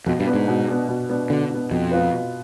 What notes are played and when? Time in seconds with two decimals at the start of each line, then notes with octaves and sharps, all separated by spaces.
0.06 F2 B2
0.20 G2
0.27 B3 D4
0.34 G#2
0.48 B2
0.68 B3 D4
0.89 B2
1.09 B3 D4
1.30 B2 D3
1.50 B3 D4
1.71 F2 B2
1.91 B3 F4 B4
2.12 B2